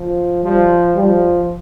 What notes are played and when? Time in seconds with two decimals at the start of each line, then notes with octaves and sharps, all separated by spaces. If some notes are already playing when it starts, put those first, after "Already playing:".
Already playing: F3
0.44 F3 G3
0.96 F3 G3